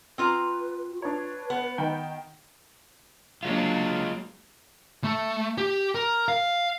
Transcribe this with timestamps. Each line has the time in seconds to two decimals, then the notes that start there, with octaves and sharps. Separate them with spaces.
0.18 C4 F4 B4 A#5
0.91 F#4
1.02 D4 B4 C#5
1.50 B3
1.78 D#3 G5
3.43 F#3 G#3 A#3 D4 F4
5.04 A3
5.58 G4
5.95 A#4
6.28 F5